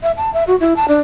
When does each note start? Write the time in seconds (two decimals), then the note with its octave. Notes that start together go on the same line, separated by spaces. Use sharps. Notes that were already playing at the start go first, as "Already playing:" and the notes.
0.03 E5
0.17 A5
0.34 E5
0.47 F#4
0.60 E4
0.76 A5
0.88 D4